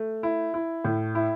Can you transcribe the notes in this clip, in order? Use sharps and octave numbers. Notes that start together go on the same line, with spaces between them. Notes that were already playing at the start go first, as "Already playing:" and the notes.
Already playing: A3
E4
E4
A2
E4